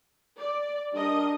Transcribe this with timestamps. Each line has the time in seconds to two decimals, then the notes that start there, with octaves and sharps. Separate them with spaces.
0.39 D5
0.94 G3 D4 A#4 D#5